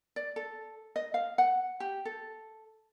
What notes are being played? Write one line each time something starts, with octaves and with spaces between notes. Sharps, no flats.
D5
A4
D#5
F5
F#5
G4
A4